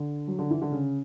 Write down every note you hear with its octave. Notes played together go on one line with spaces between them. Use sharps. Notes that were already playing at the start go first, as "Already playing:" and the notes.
Already playing: D3
F#3
D3
E3
D3
C#3